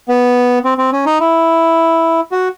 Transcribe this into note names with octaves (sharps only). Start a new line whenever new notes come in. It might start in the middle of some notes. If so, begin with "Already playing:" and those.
B3
C4
C4
C#4
D#4
E4
F#4